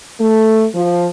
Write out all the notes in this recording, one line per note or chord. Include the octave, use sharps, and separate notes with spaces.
A3
F3